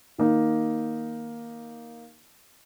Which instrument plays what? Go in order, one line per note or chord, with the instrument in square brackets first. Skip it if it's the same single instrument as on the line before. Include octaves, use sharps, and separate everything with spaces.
[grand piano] D#3 A#3 D#4